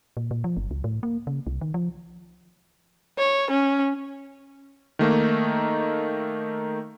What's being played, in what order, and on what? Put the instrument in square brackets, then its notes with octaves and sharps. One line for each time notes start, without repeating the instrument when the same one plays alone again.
[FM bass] A#2
A#2
F3
G1
C#2
A2
A#3
C#3
C2
D#3
F3
[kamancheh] C#5
C#4
[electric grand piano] D#3 A3 A#3 D#4